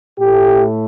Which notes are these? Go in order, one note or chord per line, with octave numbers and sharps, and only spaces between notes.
A2 A3 G4